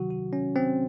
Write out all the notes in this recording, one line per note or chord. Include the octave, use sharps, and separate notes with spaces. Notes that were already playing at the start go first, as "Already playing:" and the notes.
Already playing: C3 D#3 F#3 F#4
F#4
C#4
C4